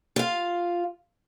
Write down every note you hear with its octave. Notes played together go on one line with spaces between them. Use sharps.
F4 F5